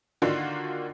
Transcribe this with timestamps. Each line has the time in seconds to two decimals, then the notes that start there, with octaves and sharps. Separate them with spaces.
0.22 D3 D#3 A#3 D4 F4 F#4